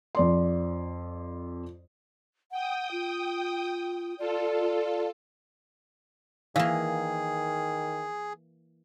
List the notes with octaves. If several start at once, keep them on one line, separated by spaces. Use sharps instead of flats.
F2 D5 C6
F#5 G5 D#6
F4
F4 A4 D5
D#3 E3 A#3 G#4 F5